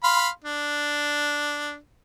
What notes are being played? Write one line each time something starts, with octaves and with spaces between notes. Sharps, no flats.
F5 B5 C6
D4